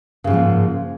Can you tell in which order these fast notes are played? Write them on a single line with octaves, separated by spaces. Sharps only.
C#3 G#2 F3 A#3